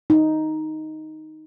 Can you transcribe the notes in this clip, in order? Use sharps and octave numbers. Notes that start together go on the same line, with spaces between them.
D#4